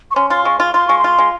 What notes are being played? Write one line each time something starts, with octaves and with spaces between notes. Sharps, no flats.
C#6
C#4 C6
F4 C6
G#3 C#6
F4 C6
F4 C6
G#3 C#6
C6
F4
G#3